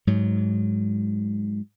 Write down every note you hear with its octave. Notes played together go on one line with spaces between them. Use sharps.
G#2 F#3